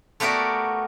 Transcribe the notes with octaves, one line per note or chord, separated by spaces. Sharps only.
A3 B3 F#4 G4 A#4 D5